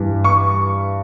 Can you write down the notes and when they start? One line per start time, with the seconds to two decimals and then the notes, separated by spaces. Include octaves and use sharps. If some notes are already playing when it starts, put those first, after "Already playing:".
Already playing: G2 E3
0.24 C#6